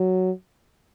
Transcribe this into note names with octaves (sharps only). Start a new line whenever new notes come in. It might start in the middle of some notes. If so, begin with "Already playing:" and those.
Already playing: F#3